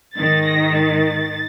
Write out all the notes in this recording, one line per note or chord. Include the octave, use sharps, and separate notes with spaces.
G#2 D#3 A6
A#6
A6